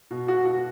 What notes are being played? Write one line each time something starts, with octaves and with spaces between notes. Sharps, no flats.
B2
F#4
F#4